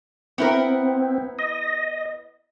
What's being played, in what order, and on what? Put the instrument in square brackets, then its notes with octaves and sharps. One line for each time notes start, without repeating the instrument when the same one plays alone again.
[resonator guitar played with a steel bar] B3 E4 A#4 [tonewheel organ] C4
[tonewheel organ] D#5